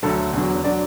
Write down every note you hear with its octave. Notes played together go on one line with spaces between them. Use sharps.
D2 D3 F#3 A4
E2 D3 F#3
D3 F#3 D5